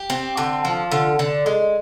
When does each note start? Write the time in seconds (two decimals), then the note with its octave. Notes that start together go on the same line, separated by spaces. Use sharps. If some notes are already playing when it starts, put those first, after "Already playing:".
Already playing: G4
0.10 C4
0.37 D3
0.65 F3
0.91 D3
1.19 D3
1.46 G#3